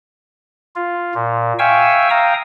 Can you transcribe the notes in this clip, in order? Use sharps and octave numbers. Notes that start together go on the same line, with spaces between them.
F4
A#2
E5 F5 G5 G#5 C#6 E6
F5 G5 A#5 D#6